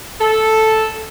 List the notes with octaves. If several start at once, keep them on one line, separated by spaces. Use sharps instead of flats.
A4